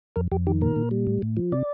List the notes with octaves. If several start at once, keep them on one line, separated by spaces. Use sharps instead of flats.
F2 A#4
F2 G4
D#3 G4
A#2 A#4
A#2
G3
A2
A2
F3
C3 D5